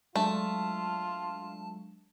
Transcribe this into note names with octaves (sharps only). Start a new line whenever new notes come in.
F#3 G#3 A3 D4 F4 A5